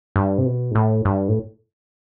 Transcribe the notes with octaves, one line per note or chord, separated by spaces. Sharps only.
G2
C3
B2
G#2
A2
G2
A2